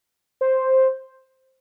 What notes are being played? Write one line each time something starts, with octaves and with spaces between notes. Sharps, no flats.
C5